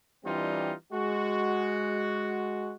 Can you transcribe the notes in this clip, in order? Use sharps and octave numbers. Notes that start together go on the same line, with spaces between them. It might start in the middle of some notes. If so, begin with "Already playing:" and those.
E3 G3 C4 D4 D#4 F4
G#3 F#4